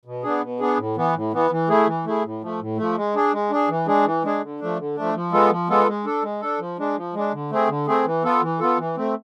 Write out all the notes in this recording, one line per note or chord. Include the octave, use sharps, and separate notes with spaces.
B2
B3 D4 G#4
B2
B3 D4 G#4
A2
E3 B3
A2
E3 B3
E3
A3 E4 G#4
E3
A3 E4 G#4
A2
F3 A3
A2
F3 A3
G#3
D4 G#4
G#3
D4 G#4
E3
G#3 D4 G#4
E3
G#3 D4 G#4
D3
F3 A3 D4
D3
F3 A3 D4
F3
G#3 B3 F4 A4
F3
G#3 B3 F4 A4
G#3
D4 A4
G#3
D4 A4
F3
G#3 D4
F3
G#3 D4
D3
A3 C4 G#4
D3
A3 C4 G#4
E3
B3 F4 A4
E3
B3 F4 A4
E3
A3 C4